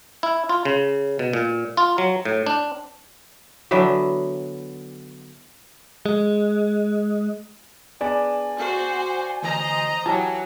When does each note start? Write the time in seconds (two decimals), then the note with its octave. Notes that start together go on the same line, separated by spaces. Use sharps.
0.23 E4
0.49 F4
0.65 C#3
1.19 B2
1.33 A#2
1.77 F4
1.98 F#3
2.25 A2
2.47 D4
3.71 D3 E3 F#3 B3
6.06 G#3
8.01 B3 D4 G#4 D5 G#5
8.57 F#4 C5
9.42 D2 E3 C5 D#5 A#5
10.06 E3 F#3 G4 A5